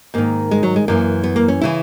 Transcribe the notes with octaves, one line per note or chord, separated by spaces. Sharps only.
G#2 D#3 A#3
G#3
F#3
G#3
F#2 E3 A#3
B3
A#3
C#4
C#3 E3 E4